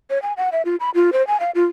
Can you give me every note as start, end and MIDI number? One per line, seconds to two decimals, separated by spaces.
0.10 0.21 73
0.22 0.33 80
0.37 0.49 78
0.52 0.62 76
0.65 0.76 65
0.80 0.90 83
0.95 1.10 65
1.13 1.26 72
1.27 1.39 80
1.40 1.51 77
1.55 1.66 65